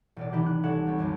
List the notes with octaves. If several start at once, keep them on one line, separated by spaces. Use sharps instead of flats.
E1 A1 D5
C3 E3 D#4 E4 G4
F#6
C2 G#3 A4 C#5 F#5
B3 C4 A4 C#5
G1 C2 F#2